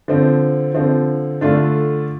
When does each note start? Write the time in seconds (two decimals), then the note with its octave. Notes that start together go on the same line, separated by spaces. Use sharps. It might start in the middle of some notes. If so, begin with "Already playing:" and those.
0.08 D3 F3 C4
0.74 D3 F3 C4
1.41 D3 A3 D4 F4